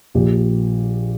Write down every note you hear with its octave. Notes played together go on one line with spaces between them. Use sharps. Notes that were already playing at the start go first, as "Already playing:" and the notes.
A#1 A#2 F3 G4